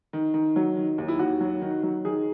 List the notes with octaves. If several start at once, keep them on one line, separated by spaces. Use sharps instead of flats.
D#3
D#3
F#3
D#3
D#2
E4
D#2 F#4
F#3
D#3
F#3
D#3 G#4